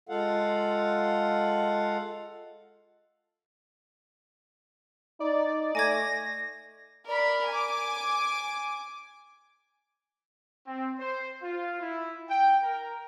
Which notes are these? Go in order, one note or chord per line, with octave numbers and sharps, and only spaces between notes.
G#3 F4 A4 F5 F#5
D#4 D5
A3 G#5 D6 G#6 A#6
A#4 D5 B5
G#5 D6
C4
C5
F4
E4
G5
A#4